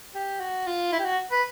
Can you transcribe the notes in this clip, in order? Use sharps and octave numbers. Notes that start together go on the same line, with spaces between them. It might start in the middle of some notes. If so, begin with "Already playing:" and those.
G4
F#4
F4
E4
G4
F#4
B4